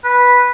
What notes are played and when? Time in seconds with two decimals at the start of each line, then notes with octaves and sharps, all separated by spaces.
0.04 B4